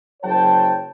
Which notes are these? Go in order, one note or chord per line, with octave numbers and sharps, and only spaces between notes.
F#1 F#3 C5 C#5 G5 A5